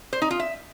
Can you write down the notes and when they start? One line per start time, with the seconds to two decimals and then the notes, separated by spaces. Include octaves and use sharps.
0.13 C5
0.22 D#4
0.31 F4
0.40 E5